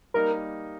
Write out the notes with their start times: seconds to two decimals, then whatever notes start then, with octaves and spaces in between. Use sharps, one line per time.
0.14 G3 A#3 D#4 A#4